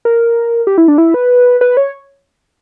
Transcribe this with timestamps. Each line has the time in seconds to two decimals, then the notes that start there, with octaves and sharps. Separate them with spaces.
0.05 A#4
0.67 G4
0.78 E4
0.88 D4
0.98 E4
1.14 B4
1.61 B4
1.77 C#5